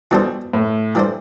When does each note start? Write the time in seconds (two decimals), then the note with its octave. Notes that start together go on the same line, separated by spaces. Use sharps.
0.11 B2 E3 G3 D4 A4 C5
0.53 A2
0.95 E3 G3 D4 A4 C5